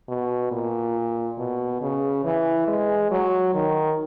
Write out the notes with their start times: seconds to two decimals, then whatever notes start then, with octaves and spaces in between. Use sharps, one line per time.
0.09 B2
0.52 A#2
1.38 B2
1.81 C#3
2.25 E3
2.68 G#3
3.11 F#3
3.54 D#3